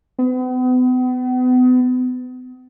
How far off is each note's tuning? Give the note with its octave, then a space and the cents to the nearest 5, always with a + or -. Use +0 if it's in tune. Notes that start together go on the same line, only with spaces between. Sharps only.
B3 +40